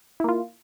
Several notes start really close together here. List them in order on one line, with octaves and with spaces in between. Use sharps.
E4 A#3 F4